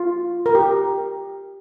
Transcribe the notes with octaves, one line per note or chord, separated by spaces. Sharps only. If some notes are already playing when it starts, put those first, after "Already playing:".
Already playing: F4
A#4
G4